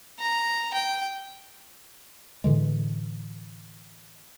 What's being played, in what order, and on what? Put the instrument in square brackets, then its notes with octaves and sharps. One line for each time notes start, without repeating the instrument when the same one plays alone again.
[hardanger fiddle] A#5
G5
[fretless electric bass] A2 D3 E3 G#3